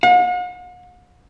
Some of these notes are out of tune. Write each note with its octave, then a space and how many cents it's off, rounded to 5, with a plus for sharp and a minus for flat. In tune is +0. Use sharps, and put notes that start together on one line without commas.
F#5 -45